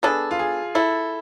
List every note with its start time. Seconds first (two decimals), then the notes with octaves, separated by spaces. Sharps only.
0.03 B3 D4 G#4 A4
0.31 F4
0.39 G#4
0.75 E4 A4